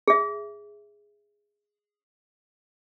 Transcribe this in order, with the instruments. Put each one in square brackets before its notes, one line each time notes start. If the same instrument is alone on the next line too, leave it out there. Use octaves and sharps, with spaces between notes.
[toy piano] G#4 E5